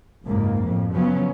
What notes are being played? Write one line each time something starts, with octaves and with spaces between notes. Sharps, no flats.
F#1 C#2 G#2 A#3
F2 A2
C#3 F3 F#3 B3 C#4